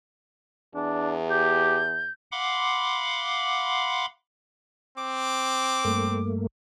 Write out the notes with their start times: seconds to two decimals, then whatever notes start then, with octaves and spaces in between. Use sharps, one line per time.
0.75 E2 D4
1.30 G4 G6
2.32 F5 F#5 B5 C6 D6
4.98 C4 D6
5.85 G2 A3 A#3